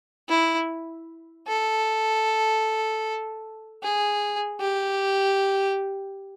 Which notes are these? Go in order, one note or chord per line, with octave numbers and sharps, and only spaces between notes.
E4
A4
G#4
G4